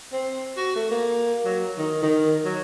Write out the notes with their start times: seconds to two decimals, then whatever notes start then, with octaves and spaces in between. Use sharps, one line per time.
0.13 C4
0.57 F#4
0.76 A3
0.91 A#3
1.45 F#3
1.78 D#3
2.03 D#3
2.45 F#3